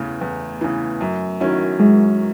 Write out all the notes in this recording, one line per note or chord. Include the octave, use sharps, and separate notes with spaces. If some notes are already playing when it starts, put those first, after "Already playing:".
Already playing: E2 C#3 E3 A3
E2
C#3 E3
F#2
D#3 F#3 C#4 E4
F#2 G#3